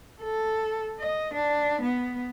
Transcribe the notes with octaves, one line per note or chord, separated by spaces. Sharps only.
A4
D#5
D4
B3